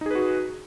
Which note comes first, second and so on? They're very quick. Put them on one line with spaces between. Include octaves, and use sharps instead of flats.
D#4 G#4 B4 F#4